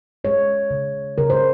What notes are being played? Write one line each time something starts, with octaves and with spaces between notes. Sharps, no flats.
G#3 C#5
C#3
C#3 A#4
C5